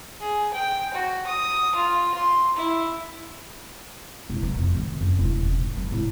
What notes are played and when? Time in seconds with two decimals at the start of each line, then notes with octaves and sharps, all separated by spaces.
0.21 G#4
0.54 G5
0.94 F#4
1.27 D#6
1.76 F4
2.15 C6
2.57 E4
4.30 E1
4.43 F#3
4.58 F2
4.75 D#3
5.00 F#2
5.19 E1
5.45 C#4
5.58 G#2
5.77 F#3
5.92 A2